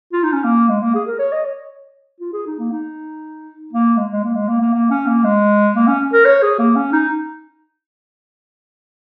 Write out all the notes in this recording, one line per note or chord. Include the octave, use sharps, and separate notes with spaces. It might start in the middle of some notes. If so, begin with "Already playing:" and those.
F4
D#4
C#4
A#3
G#3
A#3
G#4
A#4
C#5
D#5
C#5
F4
G#4
D#4
A#3
D#4
A#3
G#3
G#3
A#3
G#3
A#3
A#3
A#3
C#4
A#3
G#3
A#3
C#4
A#4
C#5
G#4
A#3
C#4
D#4